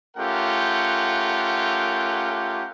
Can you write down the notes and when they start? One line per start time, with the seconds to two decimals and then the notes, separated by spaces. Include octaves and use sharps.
0.17 A3 C#4 F4 G4 A#4 F#5